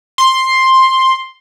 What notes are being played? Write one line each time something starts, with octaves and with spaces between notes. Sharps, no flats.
C6